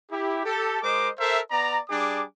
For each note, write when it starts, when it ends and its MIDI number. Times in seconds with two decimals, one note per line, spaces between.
0.10 0.44 64
0.10 0.44 67
0.45 0.79 67
0.45 0.79 69
0.82 1.10 56
0.82 1.10 70
0.82 1.10 72
0.82 1.10 75
0.82 1.10 86
1.19 1.39 69
1.19 1.39 70
1.19 1.39 72
1.19 1.39 76
1.50 1.79 59
1.50 1.79 74
1.50 1.79 82
1.89 2.23 55
1.89 2.23 62
1.89 2.23 68
1.89 2.23 86